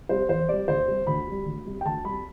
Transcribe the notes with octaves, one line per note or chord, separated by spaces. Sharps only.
C3 G3 C5
E2 C5
C3 G3 D5
D2 C5
C3 G3
D2 B5
C3 G3
D2
C3 G3
G5
D2 A5
C3 G3 B5